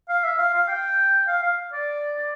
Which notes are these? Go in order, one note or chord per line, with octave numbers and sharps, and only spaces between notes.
F5
E5
F5
F5
G5
F5
F5
D5
D5